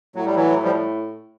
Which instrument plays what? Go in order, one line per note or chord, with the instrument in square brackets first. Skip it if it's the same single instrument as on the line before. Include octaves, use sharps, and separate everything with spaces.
[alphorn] A2 [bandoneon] F#3
[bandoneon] G3
E3 F#3
F3 G3